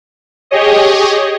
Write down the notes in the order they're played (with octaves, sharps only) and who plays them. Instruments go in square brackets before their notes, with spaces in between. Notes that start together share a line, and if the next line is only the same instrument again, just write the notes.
[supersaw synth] G4 G#4 C#5 D#5